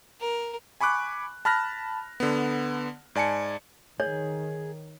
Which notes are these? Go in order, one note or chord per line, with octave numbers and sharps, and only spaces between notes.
A#4
G#5 B5 C#6 D6 F#6
A5 B5 F6 F#6 A#6
D3 B3
G#2 D5 G#5 A5 C#7
D#3 G#4 C#5